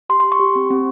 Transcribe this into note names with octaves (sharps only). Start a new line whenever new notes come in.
G4 C6
G4 C6
C#6
G4
C4
C4